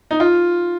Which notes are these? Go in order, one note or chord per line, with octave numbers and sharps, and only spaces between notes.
D#4
F4